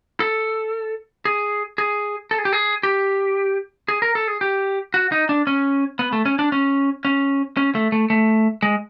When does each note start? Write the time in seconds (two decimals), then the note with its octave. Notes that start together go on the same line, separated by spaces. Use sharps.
0.20 A4
1.25 G#4
1.78 G#4
2.31 A4
2.38 G#4
2.45 G4
2.53 G#4
2.83 G4
3.88 G#4
4.02 A#4
4.15 A4
4.28 G#4
4.41 G4
4.94 F#4
5.12 D#4
5.29 D4
5.47 C#4
5.99 B3
6.13 A3
6.26 C#4
6.39 D4
6.52 C#4
7.05 C#4
7.57 C#4
7.75 A3
7.92 A3
8.10 A3
8.63 G#3